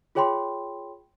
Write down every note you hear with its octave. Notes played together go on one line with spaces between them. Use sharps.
F4 G#4 C#5 G5 B5 C6